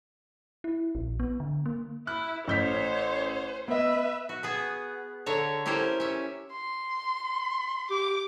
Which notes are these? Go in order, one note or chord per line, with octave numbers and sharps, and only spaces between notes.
E4
A#1
B3
D3
A#3
E4 F#6
A1 C5 C#5 G6 B6
B3 B4 D#5 E5
F#4
B3 G#4 B4
D3 C#5 E5 A#5
C#4 E4 G4 A#4 C5
C#4 E5
C6
G4 D6